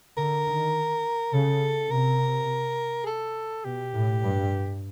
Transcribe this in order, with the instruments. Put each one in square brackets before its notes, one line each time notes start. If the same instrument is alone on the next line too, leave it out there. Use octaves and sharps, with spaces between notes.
[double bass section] D3 [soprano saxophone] A#4
[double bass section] D#3
[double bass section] C#3 [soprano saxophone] A4
[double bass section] C3 [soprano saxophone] A#4
[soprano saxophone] G#4
A4
[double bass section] B2 [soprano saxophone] G4
[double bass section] A2
G2